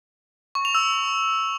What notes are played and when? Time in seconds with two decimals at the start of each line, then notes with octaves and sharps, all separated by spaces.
0.55 C#6
0.65 F7
0.75 E6